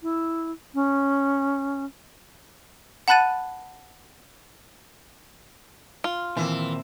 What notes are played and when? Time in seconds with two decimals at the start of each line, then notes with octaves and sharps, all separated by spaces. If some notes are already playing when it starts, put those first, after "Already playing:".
0.02 E4
0.74 C#4
3.08 F#5 A5 B5 F#6 A6 D#7
6.04 F4
6.37 A#2 D#3 E3 C4